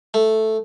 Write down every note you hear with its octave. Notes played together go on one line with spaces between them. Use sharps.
A3